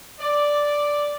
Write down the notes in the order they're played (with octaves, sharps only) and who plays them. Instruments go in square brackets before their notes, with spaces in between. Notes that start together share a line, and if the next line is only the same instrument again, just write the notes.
[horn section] D5